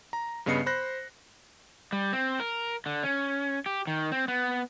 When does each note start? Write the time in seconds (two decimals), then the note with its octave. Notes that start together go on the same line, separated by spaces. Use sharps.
0.13 A#5
0.46 G2 C#3 B3 D#5 C7 C#7
0.66 C5 B5 F#6 A#6
1.92 G3
2.13 C4
2.40 A#4
2.86 D3
3.03 C#4
3.66 G4
3.87 D#3
4.12 C4
4.28 B3